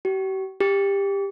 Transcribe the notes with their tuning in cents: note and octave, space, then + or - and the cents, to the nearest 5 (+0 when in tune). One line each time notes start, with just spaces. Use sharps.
G4 -45
G4 +20